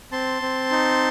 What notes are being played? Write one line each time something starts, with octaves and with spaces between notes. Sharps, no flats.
C4 A5 C6
C4
D#4